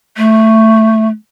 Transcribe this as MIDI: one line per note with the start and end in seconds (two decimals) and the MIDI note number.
0.17 1.07 57